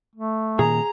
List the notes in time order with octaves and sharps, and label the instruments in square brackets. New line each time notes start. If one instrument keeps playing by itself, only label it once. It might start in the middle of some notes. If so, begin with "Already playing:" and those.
[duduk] A3
[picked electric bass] A#2 D#3 A#3 [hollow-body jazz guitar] G#4 [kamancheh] A#5